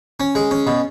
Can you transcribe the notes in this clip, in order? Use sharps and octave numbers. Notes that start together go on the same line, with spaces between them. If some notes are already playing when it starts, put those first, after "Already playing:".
C#4
G#3
C#4
B2